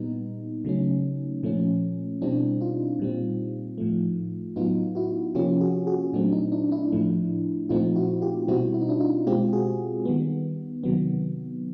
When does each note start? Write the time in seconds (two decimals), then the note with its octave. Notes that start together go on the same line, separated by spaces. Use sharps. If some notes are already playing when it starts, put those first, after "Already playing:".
Already playing: A#2 G3 B3 D#4
0.65 C#3 F#3 A3 C#4
1.43 A#2 F3 A3 C#4
2.22 B2 G3 C4 D4 E4
2.60 D#4 F4
2.99 A#2 G3 C4
3.78 A2 F3 A3
4.56 A2 F#3 B3 D#4 F4
4.95 E4 F#4
5.35 C3 F3 A#3 C#4 F4 G4
5.61 F#4 G#4
5.87 F#4 G#4
6.13 A#2 F#3 A3 C4 D4
6.32 D#4
6.52 D4 E4
6.71 D4 E4
6.92 A2 F3 A3
7.69 A#2 F3 A3 C4 D#4 F4
7.96 E4 F#4
8.22 F4 G4
8.48 B2 G3 C4 E4 F#4
8.74 E4
8.81 D#4
8.89 D4 E4
9.00 D#4 F4
9.26 B2 G#3 C4 F4 G4
9.53 F#4 G#4
10.05 D#3 G3 B3
10.83 C3 D#3 F#3 B3